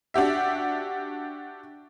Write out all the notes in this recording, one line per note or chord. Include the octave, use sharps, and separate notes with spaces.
D4 F#4 G4 E5